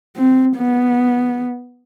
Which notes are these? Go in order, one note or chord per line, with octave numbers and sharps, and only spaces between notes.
C4
B3